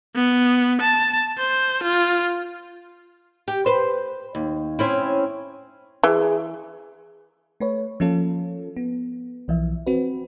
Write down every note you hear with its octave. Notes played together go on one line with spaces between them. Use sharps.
B3
A5
C5
F4
G4
B4 C5
D#2
C4 C#4 E4
E3 G#4
A3 B4 C#5
F3 A#3 C#4 F4 A4
B3
B1 E3 F3 E5
C4 F#4 B4